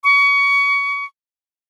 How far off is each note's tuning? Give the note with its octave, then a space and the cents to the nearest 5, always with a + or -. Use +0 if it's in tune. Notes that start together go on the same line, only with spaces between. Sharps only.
C#6 +25